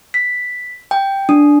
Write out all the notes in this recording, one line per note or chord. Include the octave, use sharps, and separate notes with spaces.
B6
G5
D4